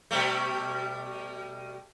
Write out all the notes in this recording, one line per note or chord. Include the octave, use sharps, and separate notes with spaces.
B2 G3 A3